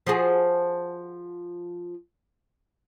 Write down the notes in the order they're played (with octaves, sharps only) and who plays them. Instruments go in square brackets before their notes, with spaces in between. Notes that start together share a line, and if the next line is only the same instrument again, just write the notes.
[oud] F3 F#4 G#4